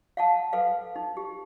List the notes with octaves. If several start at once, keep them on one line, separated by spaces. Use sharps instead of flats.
F5 F#5 A5
A4 B4 F5
D#4
G4